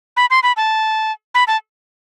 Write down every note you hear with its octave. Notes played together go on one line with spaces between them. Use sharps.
B5
C6
B5
A5
B5
A5